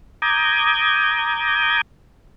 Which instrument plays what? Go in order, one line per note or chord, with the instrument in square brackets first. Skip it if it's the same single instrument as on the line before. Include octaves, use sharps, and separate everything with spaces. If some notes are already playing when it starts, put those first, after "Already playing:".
[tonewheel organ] A#5 D6 D#6 G6 G#6